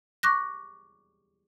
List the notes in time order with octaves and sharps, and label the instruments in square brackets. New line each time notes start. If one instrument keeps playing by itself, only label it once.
[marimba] C#6 D6 F#6 A#6